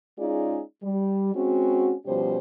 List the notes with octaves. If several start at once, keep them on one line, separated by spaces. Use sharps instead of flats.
G#3 C#4 D#4 F4 G#4 D5
G3
G#3 C4 C#4 F#4
B2 F3 G3 C#4 G4 C5